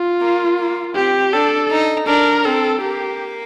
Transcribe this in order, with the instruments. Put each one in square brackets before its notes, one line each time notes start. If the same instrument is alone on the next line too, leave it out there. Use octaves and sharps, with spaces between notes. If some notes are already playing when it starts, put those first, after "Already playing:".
Already playing: [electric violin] F4
[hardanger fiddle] A#3
A#3
[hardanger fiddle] C4 [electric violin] G4
[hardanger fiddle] D4 [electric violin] A4
[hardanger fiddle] D#4
[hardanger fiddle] D4 [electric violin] A#4
[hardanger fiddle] C4 [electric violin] A4
[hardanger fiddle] A#3 [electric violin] G4